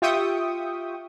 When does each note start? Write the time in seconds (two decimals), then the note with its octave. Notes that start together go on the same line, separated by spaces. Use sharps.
0.02 F4 G4 E5 G5 C#6 D#6